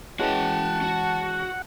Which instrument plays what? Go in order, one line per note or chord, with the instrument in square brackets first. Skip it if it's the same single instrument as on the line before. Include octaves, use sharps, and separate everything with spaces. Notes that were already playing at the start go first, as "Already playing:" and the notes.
[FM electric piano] E3 G#3 C#4 [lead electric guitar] F#4 G5 [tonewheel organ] F#5 [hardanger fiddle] A5
[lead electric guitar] F#4